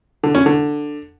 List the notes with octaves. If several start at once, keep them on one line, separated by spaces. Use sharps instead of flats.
D3
C#4
D3